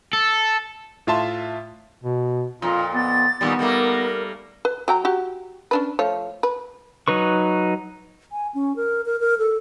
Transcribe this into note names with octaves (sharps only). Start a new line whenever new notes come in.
A4
A2 F4 E5 A5 C6
B2
F2 A#2 F4 A#5
B3 A6
A#2 D#3 G3 B3
G3 A3 A#3 A#4
B4
F#3 G5 A#5
F#4 G4
C#4 D4 B4
F3 A3 C#5
B4
F#3 D#4 B4 C#6
G#5
C#4
A#4
A#4
A#4
A4